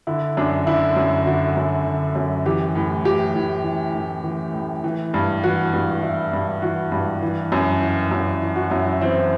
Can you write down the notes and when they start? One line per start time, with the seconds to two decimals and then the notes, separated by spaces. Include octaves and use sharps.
0.07 D3 E4
0.37 F#2 D4
0.67 D3 E4
0.96 F#2
1.26 D3 F#4
1.56 F#2
1.86 D3
2.15 F#2
2.46 E3 G4
2.75 A2
3.05 E3 G4
3.34 A2
3.64 E3
3.95 A2
4.24 E3
4.54 A2
4.84 E3
5.14 G2
5.43 E3 F#4
5.74 G2
6.03 E3 E4
6.33 G2
6.62 E3 F#4
6.92 G2
7.22 E3
7.52 F#2
7.82 E3
8.11 F#2
8.41 E3
8.56 F#4
8.71 F#2 E4
8.86 E4
9.01 E3 C4